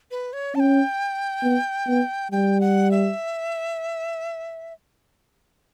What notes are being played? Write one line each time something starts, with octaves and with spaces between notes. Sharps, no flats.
B4
C#5
C#4 G5 A5
B3
B3
G3 G5
F#5
E5